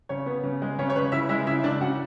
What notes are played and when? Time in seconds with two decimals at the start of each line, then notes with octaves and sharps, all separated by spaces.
0.09 C#3 C#5
0.26 B3
0.43 C#3
0.62 G#3
0.79 C#3 C#5
0.90 C#5
0.95 C#3 B4
1.12 C#3 E4 E5
1.29 G#3 E4 E5
1.47 C#3 E4 E5
1.64 C#3 D4 D5
1.81 C#3 F#4 F#5